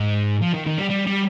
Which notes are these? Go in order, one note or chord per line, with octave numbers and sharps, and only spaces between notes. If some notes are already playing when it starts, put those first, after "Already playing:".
Already playing: G#2
F3
D#3
D#3
G3
G3
G3